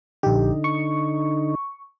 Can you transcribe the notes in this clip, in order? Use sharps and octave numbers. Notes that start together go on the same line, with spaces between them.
A#1 D3 D#4 G4
C#6